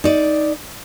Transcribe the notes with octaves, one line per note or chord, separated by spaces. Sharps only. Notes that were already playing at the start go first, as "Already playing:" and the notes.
D#4 D5